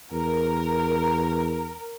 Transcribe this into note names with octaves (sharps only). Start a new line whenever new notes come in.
E2 A#4